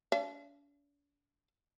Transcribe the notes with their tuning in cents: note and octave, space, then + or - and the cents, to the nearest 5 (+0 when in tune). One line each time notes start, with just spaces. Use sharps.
D4 -45 F5 -45